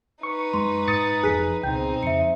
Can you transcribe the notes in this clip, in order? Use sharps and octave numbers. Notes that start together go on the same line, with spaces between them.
D#4 B4 C#6
F#2 G#3 C6
G#2 D#6 A6 C#7
F#1 F2 G#4 F#6 B6
C#2 B2 C4 D#4 G5 G6
F2 C#3 E5 C#7